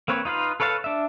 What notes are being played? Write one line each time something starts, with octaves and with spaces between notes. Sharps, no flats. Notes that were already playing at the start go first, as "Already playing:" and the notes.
A#3 C4 B4 C#5
D#4 F4 B4 F5
A4 B4 C#5 F5 A5
D4 E5